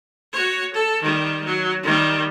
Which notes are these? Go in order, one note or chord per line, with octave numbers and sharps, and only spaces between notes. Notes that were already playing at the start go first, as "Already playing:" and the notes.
F#4 C#5
A4
D#3 G3
F#3
D#3 G3